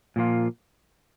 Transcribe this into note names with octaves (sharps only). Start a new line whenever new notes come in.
A#2 F3 A#3 F4